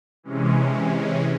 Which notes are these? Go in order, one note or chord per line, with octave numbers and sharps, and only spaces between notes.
C3 E3 G#3 C#4